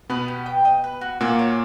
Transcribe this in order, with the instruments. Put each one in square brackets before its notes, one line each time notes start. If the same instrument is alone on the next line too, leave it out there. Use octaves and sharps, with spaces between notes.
[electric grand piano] B2 B3 [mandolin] B4
[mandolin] G4
G5
D#5
B4
F#4
[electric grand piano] A#2 A#3 [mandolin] F#4
[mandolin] C#5